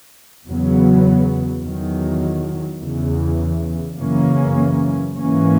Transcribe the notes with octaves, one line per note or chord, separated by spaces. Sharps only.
E2 C#3 F#3 B3
E2 D#3 F#3
E2 C#3 E3
F#2 C#3 E3 A#3 C#4
G#2 E3 A#3 C#4